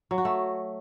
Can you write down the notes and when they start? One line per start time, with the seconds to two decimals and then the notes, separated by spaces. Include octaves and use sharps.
0.11 F#3
0.18 F#4
0.25 A3